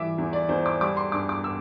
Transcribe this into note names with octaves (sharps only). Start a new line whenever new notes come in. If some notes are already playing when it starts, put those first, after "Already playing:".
Already playing: E3 G3 E5 D6
E2
D5
E2 C5
D6
G3 D6
C6
G2 D6
D6
E6